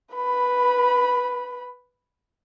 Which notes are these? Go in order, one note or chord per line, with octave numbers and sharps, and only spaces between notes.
B4 B5